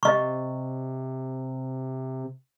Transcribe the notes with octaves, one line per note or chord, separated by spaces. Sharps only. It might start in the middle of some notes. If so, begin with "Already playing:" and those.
C3 D#5 C#6